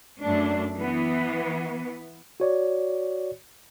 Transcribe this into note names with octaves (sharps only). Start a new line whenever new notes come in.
F#2 A3 D4
E3 B3
F#4 C#5 D5